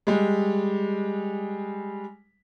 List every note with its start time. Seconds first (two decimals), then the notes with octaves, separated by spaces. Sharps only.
0.07 G3 G#3